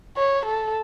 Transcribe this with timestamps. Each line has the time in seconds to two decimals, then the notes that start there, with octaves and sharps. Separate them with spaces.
0.16 C#5
0.45 A4